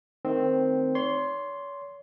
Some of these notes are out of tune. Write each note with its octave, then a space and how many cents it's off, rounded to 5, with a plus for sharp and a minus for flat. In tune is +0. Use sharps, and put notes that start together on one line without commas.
D#3 +0 A3 +0 C4 +0
C#5 +35 C6 +0